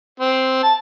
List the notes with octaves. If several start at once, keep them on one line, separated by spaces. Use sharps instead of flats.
C4
A5